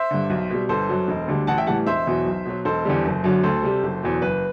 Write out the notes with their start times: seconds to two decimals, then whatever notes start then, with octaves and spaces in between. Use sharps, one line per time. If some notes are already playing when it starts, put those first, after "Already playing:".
Already playing: C5 E5
0.11 G2 D3
0.30 B1
0.50 B2 G3
0.69 G1 A4 C5
0.89 F#2 F#3
1.08 E1
1.28 D2 D3 G3
1.47 A1 F#5 A5
1.58 E5 G5
1.67 A2 E3 G3 F#5 A5
1.86 E1 C5 E5
2.07 E2 B2 F#3
2.26 B1
2.45 B2 F#3
2.65 E1 A4 C5
2.85 E2 D3 G3
3.05 F#1
3.24 F#2 D3 F#3
3.43 D2 A4 C5
3.63 C3 G3
3.83 F#1
4.03 E2 B2 F#3
4.22 F#1 B4